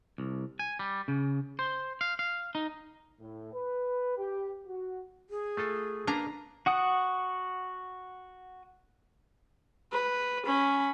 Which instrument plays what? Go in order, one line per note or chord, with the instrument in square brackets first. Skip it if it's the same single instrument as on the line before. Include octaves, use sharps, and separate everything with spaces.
[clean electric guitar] C2
G#5
G3
C#3
C5
F5
F5
D#4
[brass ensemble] A2
B4
G4
F#4
[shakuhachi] G#4
[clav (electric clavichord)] A3 F4 A4
[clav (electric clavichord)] A#3 B4 F5 [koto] D4 A#5
[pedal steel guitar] F#4 F#5 D#6
[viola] B4
C#4 B5